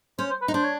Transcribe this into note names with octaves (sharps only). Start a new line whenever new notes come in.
C#4 C5
C5
B4
D#4
D4 C5
C#5